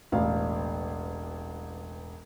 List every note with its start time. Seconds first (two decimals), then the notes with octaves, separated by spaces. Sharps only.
0.12 E1 A1 F5